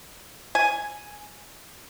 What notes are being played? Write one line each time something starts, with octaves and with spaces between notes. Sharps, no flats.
G#5